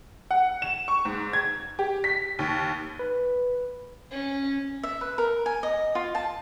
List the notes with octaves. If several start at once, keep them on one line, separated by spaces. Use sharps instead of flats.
F#5
E7
C#6
G#2
G#6
G4
B6
D#2
B4
C#4
E5
B4
A#4
G#5
D#5
F4
A5